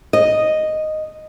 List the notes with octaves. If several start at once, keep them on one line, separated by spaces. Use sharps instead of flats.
D#5